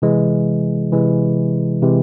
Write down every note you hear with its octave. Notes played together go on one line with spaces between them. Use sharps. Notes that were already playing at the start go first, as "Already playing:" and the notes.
C3 E3 G#3
C3 E3 G#3
C3 E3 G#3